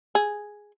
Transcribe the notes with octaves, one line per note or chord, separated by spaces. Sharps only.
G#4